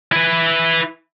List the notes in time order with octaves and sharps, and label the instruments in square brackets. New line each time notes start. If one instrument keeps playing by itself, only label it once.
[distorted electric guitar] E4 B4